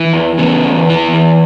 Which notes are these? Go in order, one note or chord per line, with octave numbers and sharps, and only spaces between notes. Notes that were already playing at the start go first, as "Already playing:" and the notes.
Already playing: E3
E2
C#3 B3
E2
E3
E2